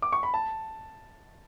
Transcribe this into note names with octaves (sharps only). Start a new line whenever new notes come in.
D6
C#6
B5
A5